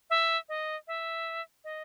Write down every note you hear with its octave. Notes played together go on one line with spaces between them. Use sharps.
E5
D#5
E5
D#5